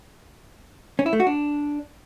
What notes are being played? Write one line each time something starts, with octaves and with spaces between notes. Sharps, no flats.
C#4
E4
A3
F#4
D4